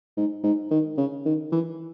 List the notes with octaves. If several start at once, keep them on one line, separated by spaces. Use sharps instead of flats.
G#2
G#2
D#3
C#3
D#3
E3